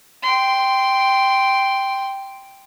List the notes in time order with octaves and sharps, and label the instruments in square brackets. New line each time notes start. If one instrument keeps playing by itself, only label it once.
[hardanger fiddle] G5 C6